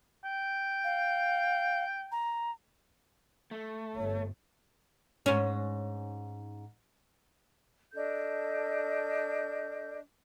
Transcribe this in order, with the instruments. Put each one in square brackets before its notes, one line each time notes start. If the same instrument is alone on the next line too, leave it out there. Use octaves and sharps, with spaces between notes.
[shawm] G5
[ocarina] F5
A#5
[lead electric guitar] A3
[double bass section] G1 [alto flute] C#5
[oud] G#2 C#4
[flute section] D4 A4 D#5 G6